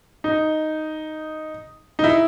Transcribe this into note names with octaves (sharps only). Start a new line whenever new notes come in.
D#4
D#4
E4